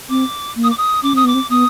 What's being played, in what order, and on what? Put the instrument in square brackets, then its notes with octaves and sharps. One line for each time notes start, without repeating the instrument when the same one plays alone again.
[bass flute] C4 [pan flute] D6
[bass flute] A#3
[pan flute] D#6
D6
D#6
[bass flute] C#4 [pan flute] D6
[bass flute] C4 [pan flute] D#6
[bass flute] B3 [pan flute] D6
[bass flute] C4
[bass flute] B3 [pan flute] D#6